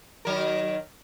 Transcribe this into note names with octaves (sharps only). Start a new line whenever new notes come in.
D#3 F#3 A#4